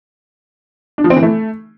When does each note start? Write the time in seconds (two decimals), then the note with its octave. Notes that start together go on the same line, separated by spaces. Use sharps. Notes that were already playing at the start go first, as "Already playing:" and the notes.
0.98 D4
1.04 F3
1.10 C4
1.16 E3
1.23 A3